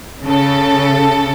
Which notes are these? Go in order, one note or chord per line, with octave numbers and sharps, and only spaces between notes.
C#3 A4